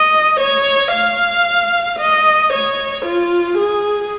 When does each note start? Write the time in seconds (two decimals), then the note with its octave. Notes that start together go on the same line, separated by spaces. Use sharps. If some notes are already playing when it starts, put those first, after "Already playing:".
Already playing: D#5
0.40 C#5
0.93 F5
1.99 D#5
2.52 C#5
3.05 F4
3.57 G#4